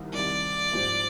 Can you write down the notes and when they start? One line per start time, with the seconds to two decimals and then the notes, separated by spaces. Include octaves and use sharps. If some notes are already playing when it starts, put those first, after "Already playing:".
Already playing: C2 C3 D#3 G3
0.13 C2 C3 D#3 G3 D5
0.73 G#2 F3 C4 G4 C5